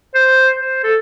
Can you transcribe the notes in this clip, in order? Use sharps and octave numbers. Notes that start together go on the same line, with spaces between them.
C5
C5
A4